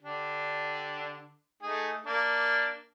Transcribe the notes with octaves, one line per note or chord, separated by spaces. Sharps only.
D3 D4 G4
A3 D#4 G#4
A#3 D4